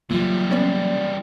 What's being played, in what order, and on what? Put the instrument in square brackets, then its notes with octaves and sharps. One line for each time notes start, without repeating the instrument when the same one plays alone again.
[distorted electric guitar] E3 G3 [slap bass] F#3 A#3 [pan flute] F4
[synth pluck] B3 C#4 B5 [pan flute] D5